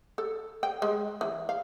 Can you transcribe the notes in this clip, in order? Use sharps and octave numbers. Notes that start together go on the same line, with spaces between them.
A4
G5
G#3
E3
F5